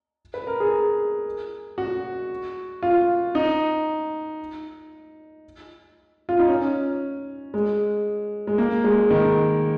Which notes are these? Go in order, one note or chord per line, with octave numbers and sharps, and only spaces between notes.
B4
A#4
G#4
F#4
F4
D#4
F4
D#4
C#4
G#3
G#3
A#3
G#3
D#3